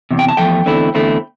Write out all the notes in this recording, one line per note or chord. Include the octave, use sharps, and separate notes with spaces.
E2 C3
G5
A5
E2 C3 F3 A3 G5
E2 D3 A3 C4 E4
E2 D3 A3 C4 E4